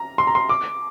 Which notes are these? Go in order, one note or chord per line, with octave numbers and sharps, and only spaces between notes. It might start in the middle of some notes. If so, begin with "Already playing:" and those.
Already playing: A#5
C6
A#5
C6
D6